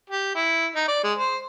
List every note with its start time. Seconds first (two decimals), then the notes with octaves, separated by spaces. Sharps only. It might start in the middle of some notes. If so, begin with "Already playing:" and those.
0.10 G4
0.35 E4
0.76 D#4
0.88 D5
1.04 G#3
1.18 C5